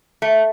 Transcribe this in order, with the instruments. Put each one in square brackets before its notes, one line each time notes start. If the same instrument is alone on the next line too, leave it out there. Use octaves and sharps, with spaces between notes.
[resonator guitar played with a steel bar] A3